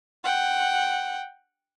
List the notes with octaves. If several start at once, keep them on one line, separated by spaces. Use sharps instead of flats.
F#5 G5